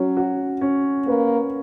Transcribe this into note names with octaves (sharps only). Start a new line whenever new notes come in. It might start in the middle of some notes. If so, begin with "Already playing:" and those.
Already playing: F#3 C#4
F#4
C#4
A#3 B4